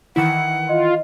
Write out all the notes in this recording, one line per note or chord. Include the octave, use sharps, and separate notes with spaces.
D#3 E3 E4 F#5
F4 D#5